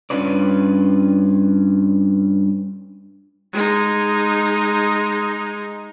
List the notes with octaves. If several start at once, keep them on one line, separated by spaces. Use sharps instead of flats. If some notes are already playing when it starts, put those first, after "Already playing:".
G2 C3 C#4 F4 B4 D5
G#3 D#4